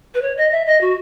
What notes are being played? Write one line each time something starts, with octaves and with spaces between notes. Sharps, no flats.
B4
C#5
D#5
E5
D#5
F#4